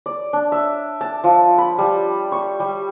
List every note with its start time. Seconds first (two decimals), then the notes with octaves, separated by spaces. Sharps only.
0.06 D5
0.33 D4
0.52 E5
1.01 A5
1.24 F3
1.58 B5
1.78 G3
2.32 C#6
2.60 G3